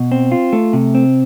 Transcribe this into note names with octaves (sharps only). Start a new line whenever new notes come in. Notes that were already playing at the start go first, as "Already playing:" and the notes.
Already playing: B2
C4
F4
A3
C3
C4